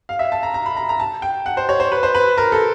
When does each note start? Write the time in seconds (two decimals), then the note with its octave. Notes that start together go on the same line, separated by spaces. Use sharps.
0.09 F5
0.19 E5
0.32 A5
0.43 A#5
0.54 A#5
0.66 B5
0.76 A#5
0.89 A#5
1.00 A5
1.22 G5
1.46 F#5
1.57 C5
1.69 C#5
1.80 C5
1.92 B4
2.03 C5
2.15 B4
2.38 A#4
2.52 A4